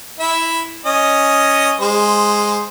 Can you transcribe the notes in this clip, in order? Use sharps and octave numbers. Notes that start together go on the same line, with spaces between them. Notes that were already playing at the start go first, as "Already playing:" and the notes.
E4 E5
C#4 D#5
G#3 C5